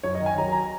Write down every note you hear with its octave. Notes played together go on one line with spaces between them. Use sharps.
F#2 C#5
D#5
D#3
G#5
F#3 A#5
A#5